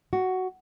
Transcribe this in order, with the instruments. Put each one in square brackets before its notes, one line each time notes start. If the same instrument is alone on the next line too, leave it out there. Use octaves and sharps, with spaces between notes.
[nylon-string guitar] F#4